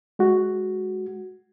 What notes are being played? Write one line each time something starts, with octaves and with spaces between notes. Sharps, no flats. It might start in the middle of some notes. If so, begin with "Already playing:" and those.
G#3 F#4